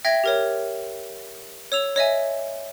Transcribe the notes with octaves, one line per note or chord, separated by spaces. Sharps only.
E5 G5 G#6 A#6
G4 A#4 C#5
C#5 E6 F7
C#5 D#5 E5 G#5